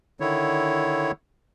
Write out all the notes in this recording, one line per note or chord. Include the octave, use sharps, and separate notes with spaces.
D3 D#3 E4 C#5